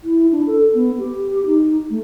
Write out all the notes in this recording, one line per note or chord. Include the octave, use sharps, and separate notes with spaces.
E4
D4
A4
B3
G4
D#4
A3